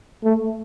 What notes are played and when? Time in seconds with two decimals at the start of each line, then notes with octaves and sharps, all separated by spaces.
0.24 A3